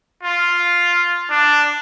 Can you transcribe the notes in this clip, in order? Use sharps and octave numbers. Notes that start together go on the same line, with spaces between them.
F4
D4